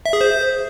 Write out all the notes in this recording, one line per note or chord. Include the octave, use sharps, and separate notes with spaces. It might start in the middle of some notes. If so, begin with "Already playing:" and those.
E5
G#4
C5